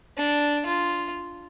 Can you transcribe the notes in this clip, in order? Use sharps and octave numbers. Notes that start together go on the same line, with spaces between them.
D4
F4